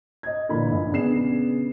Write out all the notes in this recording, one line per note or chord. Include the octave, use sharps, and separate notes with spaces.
D#5 G#6
A#2 D3 E3 B5
A#1
C#3 B3 D4 G#4 C7 E7